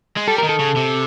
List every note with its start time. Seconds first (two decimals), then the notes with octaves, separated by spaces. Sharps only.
0.17 G#3
0.28 G3 A4
0.38 A#4
0.44 D#3
0.49 A4
0.60 C#3
0.77 C3